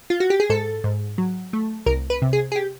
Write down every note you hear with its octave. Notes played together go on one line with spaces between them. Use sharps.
F4
F#4
G4
G#4
G#2 A4
G#2
F#3
A3
C2 A#4
B4
C3
G#4
G#4
G4